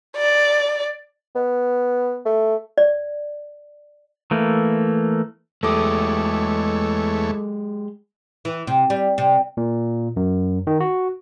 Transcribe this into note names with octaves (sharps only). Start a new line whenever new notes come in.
D5
B3
A3
D5
E3 A3 A#3
E2 G#3 A3 G4 A4 C#5 D6 D#6
E3
C3
G3
C3
A#2
F#2
D#3
F#4